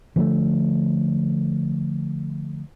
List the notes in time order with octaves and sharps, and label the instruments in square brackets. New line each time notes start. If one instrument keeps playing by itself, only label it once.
[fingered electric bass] D3 F3 G#3 A3